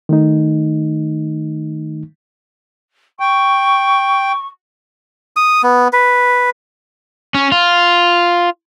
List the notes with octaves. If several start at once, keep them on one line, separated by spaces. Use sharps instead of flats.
D#3 A3 D#4
G5 C#6
D#6
B3
B4
C#4
F4